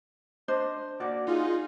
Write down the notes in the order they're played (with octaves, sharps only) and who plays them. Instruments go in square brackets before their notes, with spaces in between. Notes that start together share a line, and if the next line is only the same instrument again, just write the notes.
[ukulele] D4 C5 D#5
[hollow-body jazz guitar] A#3 F#4 D5
[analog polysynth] D#4 F4 G#4